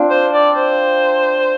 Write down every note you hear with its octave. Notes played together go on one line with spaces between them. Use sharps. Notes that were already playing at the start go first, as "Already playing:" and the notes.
Already playing: C4 D4 F4
C5
D5
C5